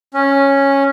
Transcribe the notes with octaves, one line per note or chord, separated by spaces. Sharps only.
C#4